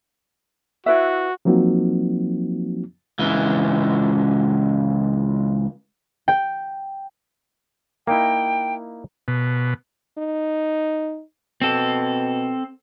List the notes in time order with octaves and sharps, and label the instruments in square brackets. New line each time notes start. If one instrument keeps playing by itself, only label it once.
[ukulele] E4 B4 E5 [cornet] F#4
[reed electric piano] F3 F#3 A#3 C4 D#4 F#4
[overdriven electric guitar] C#2 E3
[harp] G5
[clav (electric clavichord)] A#3 D#4 E4 [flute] G5
[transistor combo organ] B2
[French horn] D#4
[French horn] B2 [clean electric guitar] C4 A4